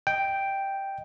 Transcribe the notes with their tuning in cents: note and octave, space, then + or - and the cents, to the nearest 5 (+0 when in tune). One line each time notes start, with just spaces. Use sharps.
D#5 +0 G5 +0